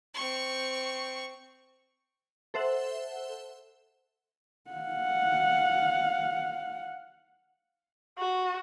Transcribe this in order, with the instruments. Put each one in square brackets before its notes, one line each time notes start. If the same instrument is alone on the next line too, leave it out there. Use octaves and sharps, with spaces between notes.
[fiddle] C4 C#6
[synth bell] A4 C5 E5 F#5
[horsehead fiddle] F5 F#5
[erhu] F#4